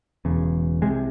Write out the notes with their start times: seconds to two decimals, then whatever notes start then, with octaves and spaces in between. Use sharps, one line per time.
0.25 E1 E2 C#3
0.82 C2 C3 G#3